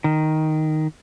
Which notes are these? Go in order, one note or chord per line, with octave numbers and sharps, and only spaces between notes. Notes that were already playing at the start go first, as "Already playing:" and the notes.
D#3